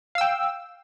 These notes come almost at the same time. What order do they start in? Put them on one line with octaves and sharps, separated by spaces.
F5 E6 G5